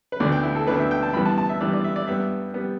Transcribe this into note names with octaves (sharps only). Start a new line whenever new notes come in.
B4
D2 D3 B3 D5
G5
E4
A4
D2 D3 B3 B4
E5
G5
A5
G2 E3 B3 B5
A5
A5
E5
G2 E3 B3 D5
D5
E5
D5
G2 G3 B3 E5
G3 B3